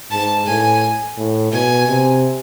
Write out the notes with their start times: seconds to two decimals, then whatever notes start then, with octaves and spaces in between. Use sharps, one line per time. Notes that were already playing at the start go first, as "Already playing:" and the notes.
0.11 G#2 A5
0.47 A2 G#5
1.17 A2
1.53 B2 G#5
1.88 C3